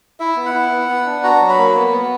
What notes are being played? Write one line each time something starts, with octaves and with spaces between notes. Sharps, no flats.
E4 E5
B3
F#5
E4
B3
B3
D4
F#4 A#5
F#3
B5
A#3
B3
B3